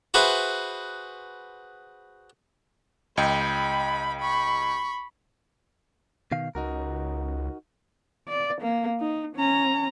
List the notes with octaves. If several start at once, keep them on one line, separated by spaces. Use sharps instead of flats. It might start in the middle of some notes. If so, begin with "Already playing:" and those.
F#4 G#4 B4 C5 E5
C#2 D#5 G5 B5
B5 C#6
B2 D#3 F5
C#2 D#4 F#4 A#4
D5
A#3
D#4
C#4 A#5